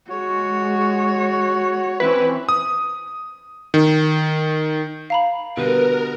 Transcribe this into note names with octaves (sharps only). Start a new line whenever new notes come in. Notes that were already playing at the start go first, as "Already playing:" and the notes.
G#3 F#4 C#5
E3 C4 C#4 E4 B4
D#6
D#3
F5 A#5 B5
B2 D3 G3 A#4 B4